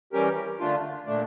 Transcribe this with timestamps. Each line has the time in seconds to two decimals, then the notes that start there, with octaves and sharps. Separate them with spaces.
0.13 E3 G3 C#4 G4 A#4
0.59 D3 A3 D4 F4
1.06 A#2 A3 D4